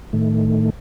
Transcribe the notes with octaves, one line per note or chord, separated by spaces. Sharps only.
A2 D#3 A3